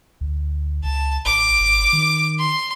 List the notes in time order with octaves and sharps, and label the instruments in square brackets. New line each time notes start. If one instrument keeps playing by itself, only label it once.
[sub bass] D2
[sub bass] C#2 [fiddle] A5
[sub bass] A1 [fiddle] D6
[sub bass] G#1
D#3
[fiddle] C6